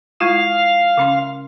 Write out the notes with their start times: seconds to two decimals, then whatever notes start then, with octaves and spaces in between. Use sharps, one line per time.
0.20 G#3 E4 F4 F5
0.98 C#3 C#4 C6